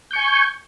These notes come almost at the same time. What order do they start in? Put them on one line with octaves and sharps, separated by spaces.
G6 C#6 G#5